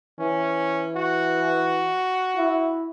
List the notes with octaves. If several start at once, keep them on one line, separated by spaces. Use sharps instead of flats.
E3 C#4
F#4
E4